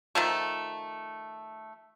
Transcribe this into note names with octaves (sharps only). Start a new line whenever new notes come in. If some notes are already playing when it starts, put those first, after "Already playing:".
D#3 F3 A3